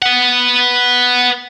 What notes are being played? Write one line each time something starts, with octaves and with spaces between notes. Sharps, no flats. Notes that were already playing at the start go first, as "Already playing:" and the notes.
B4 F#5